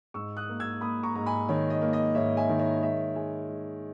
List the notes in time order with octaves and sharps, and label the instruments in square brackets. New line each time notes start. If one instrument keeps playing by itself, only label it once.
[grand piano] G#2 C#6 E6
D#6 F#6
A#3
E6 G#6
A#3 B5 D#6
A#5 C#6
G#2 A#5
G#5 B5
D#3 C#5
D#5
A#3
D#5
G#2 C#5 E5
E5 G#5
D#3
C#5 E5
G#3 C#5 E5
G#3 E5 G#5
G#3